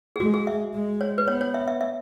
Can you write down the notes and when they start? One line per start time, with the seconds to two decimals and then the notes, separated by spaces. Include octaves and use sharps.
0.16 G#4
0.20 G#3 F#4
0.34 G#4
0.47 E5
0.74 G#3
1.01 C#5
1.18 B4
1.28 B3 C#5
1.41 C#5
1.54 E5
1.68 E5
1.81 E5